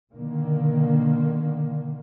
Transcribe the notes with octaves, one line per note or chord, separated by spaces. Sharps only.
B2 D3 D#3 A#3